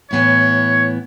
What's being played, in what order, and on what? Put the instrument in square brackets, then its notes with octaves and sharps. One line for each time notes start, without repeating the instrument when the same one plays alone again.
[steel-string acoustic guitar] A2 E3 B3 E4 [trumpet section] C#5